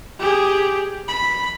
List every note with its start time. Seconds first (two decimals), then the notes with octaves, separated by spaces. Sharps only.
0.19 G4 G#4
1.08 B5